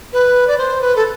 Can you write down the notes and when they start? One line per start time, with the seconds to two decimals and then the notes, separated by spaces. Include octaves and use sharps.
0.13 B4
0.47 D5
0.58 C5
0.82 B4
0.96 A4